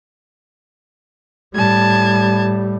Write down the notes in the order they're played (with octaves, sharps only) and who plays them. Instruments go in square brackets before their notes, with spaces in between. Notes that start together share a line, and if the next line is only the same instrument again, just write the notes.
[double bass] A2 G3 [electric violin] A5 G#6